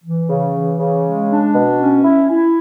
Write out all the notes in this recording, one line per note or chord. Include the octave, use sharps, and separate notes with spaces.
E3
C#3
E3
C#3
G#3
D4
B2
C#4
E4
E4